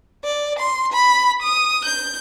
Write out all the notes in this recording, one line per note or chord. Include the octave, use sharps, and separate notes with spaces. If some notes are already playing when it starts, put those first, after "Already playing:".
D5
C6
B5
D#6
G6